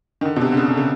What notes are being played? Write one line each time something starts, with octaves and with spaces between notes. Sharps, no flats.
D#3
D3
B2
C3
D3
C#3
D3
C#3